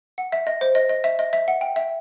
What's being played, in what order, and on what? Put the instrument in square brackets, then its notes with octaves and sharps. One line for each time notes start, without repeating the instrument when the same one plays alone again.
[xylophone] F#5
E5
D#5
C5
D#5
D#5
E5
D#5
E5
F#5
G5
E5